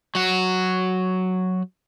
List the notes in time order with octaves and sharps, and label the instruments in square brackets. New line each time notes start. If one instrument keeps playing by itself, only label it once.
[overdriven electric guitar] F#3 F#4